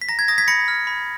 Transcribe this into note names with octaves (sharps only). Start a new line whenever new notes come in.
B6
A#5 A#6
G#6
D#6 A#6
G#6 B6
B5 A#6 C#7
F6
B5